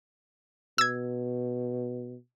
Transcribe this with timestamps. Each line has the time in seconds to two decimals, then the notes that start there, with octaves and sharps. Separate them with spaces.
0.78 B2 E6 G#6